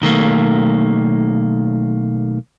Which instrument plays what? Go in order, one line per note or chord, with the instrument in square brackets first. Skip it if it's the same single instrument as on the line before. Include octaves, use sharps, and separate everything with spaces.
[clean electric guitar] B1 D#3 A3 A#3